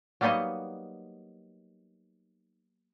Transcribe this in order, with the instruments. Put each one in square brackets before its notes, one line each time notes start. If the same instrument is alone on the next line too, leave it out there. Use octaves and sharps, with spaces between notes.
[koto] F#3 G3 A#3 B3 D#4 D#5